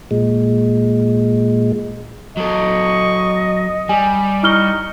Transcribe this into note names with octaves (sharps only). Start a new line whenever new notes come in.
A#2 G#3
F#3 A4 D#5 C#6
G3 G#5
D#4 E4 C#6 F6 G7